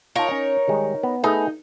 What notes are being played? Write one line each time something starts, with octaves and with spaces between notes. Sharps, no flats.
D#4 F4 A#4 C#5 A5
C#4
D#3 G3 G#3
B3
A3 B3 D#4 G#4